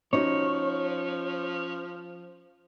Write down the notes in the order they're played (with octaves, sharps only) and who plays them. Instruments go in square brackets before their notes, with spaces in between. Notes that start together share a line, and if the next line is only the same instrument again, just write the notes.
[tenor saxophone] F3 [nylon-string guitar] C#4 D#4 F#4 [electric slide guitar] C#5